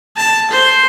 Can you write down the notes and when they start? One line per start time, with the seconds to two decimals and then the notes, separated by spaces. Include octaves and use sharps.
0.16 A5
0.50 C5